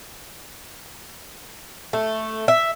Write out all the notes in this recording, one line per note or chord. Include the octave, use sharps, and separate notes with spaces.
A3
E5